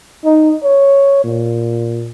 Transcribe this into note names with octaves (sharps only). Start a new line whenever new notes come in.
D#4
C#5
A#2